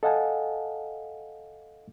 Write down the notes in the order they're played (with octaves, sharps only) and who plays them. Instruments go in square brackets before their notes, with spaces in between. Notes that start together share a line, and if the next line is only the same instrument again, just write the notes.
[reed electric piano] A4 D#5 F5 F#5 G#5 A5